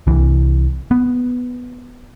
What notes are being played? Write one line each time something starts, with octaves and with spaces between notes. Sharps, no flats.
C2 C3 E3
B3